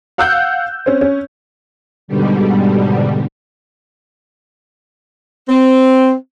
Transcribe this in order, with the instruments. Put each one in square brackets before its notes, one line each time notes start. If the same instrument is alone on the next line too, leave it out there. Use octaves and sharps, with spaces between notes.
[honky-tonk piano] F5 F#5 E6 F#6 G6
C4 C#4
C#4
[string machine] G#2 B2 D3 G3
[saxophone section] C4